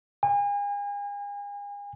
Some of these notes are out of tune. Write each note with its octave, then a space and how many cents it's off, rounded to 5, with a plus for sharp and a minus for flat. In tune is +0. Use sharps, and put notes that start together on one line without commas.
G#5 -40